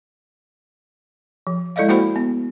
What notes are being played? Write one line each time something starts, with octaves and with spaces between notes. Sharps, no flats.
F3
G#3 E4 A4 D5 D#5 F5
A#3 E4 F#4 C5 F#5 B5
B3